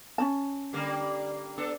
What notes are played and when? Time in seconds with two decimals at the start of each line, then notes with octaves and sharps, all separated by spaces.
0.18 C#4 D4 A5
0.73 D3 G3 A#3
1.58 B3 D4 A4